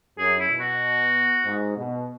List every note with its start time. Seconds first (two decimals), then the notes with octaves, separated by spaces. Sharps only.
0.19 F#2 G#4
0.40 E4
0.50 B2
0.60 F#4
1.45 G#2
1.77 B2